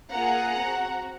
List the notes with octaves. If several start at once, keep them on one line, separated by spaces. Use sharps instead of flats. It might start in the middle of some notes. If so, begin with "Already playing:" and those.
A#3 F4 G#4 F#5 A#5
C4 F#4